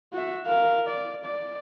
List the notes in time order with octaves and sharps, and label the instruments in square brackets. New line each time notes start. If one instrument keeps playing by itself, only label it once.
[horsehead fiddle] F#4 E5
A#4 F5
D5
D5